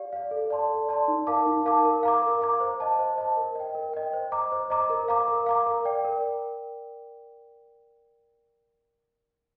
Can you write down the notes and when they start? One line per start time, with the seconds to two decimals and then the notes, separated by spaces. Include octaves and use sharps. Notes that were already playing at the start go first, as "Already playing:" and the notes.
Already playing: G4 D5 F5
0.13 D5 F5
0.31 A4
0.50 D5 A5 C6
0.69 A4
0.89 D5 A5 C6
1.08 D#4
1.27 A#4 F5 A5 D6
1.46 D#4
1.65 A#4 F5 A5 D6
1.85 A#4
2.03 F5 A#5 D6
2.22 A#4
2.41 F5 A#5 D6
2.60 C5
2.80 D#5 A5
2.99 C5
3.18 D#5 A5
3.37 A#4
3.55 D#5 G5
3.75 A#4
3.93 D#5 G5
4.13 C5
4.32 D#5 A#5 D6
4.52 C5
4.70 D#5 A#5 D6
4.90 A#4
5.08 F5 A#5 D6
5.28 A#4
5.46 F5 A#5 D6
5.66 A#4
5.85 D5 G5
6.04 A#4